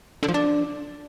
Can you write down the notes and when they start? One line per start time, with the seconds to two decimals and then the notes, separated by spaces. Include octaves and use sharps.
0.23 D3
0.28 F3
0.34 D4